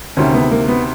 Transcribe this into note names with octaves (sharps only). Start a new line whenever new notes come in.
D2 C3 D#3 C#4
B3
A#3
B3